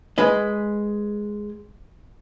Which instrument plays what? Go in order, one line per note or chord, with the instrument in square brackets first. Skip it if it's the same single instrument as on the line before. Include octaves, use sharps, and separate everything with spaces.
[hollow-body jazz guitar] G#3 B4 D#5